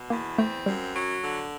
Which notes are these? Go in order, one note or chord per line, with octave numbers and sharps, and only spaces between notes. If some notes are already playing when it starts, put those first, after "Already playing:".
Already playing: B2
E2 A#3
A3 C4
F#2 G3
F#3
D3